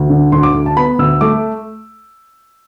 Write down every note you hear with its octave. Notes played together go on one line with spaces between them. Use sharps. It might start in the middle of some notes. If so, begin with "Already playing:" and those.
Already playing: D2
D3
D2 C6
D6
D2
A5
B3 B5
D2 E6
A3 D6